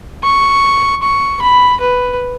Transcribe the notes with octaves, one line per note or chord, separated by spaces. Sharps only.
C#6
C#6
B5
B4